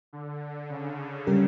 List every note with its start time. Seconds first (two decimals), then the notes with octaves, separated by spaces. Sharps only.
0.13 D3
0.70 C#3
1.27 C#3 G3 C#4 G4 A#4